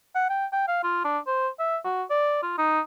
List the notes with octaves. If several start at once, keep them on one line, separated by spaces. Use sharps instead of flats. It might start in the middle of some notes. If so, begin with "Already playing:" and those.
F#5
G5
G5
F5
F4
D4
C5
E5
F#4
D5
F4
D#4